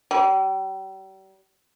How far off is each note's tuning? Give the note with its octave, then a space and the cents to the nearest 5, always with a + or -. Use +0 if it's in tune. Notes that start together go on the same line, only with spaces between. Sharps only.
G3 -40